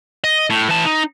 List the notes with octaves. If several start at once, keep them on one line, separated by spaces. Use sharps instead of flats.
D#5
A2
E3 A5
D#4